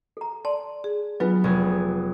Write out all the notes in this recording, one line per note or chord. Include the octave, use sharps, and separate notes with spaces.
A4 A#5
D5 A5 C6
G#4
F#3 B3 D4 F4 B4
F1 G#4